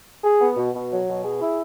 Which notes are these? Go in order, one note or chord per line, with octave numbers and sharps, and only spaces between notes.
G#4
B3
B2
B2
F#3
B2
G#4
E4